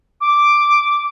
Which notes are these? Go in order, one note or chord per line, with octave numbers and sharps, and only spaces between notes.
D6